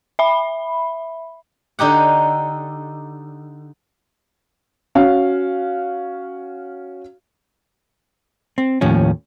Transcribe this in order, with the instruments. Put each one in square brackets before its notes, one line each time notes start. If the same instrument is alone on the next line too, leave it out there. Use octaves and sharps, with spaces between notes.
[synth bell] E5 B5
[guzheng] D3 D#4 G4 F#5
[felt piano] C#4 F#4 F5
[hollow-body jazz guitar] C4
D#2 A2 F3 C#4